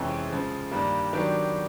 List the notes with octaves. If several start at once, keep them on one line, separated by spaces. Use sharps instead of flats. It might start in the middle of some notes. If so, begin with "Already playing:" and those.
Already playing: F2 C3 E3 G#3 C#4
C#3 F3 G#3
G2 D#3 G3 A#3
D#3 F#3 B3 D4 G4